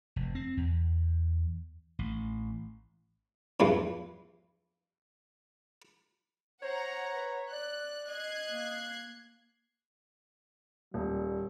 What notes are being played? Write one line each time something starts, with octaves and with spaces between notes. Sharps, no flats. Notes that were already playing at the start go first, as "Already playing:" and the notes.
F1
C4
E2
A1
E2 G2 E3 F3
C5 C#5 F#5 A#5
B4
D5 F#6
D#5 F#6 G#6 C7
A#3
D#1 G3